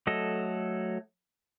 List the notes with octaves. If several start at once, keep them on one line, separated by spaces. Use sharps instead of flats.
F#3 A3 A4 D#5